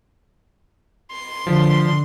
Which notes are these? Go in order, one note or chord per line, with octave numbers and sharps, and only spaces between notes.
C6
D3 F3